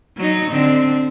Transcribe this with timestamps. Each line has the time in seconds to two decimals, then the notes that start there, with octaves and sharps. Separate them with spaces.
0.17 F#3 D#4
0.50 D3 C4